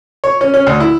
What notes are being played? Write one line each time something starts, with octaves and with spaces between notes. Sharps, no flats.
C#5
C#4
C#4
D2
E4